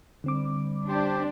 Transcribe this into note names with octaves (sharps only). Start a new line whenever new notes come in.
D3 G3 C4 D6
D4 G4 C5